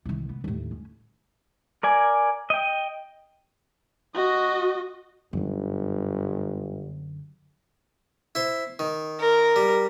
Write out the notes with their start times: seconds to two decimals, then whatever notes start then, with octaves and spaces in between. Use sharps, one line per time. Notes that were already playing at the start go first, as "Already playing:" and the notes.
0.05 C2 D#3
0.29 B3
0.44 D#2 A2
0.71 C#4
1.83 A#4 D5 G#5
2.50 D#5 G5
4.15 F#4 D#5
5.33 G1 F#2 D3
8.35 E4 C5
8.79 D#3
9.20 A#4
9.56 G3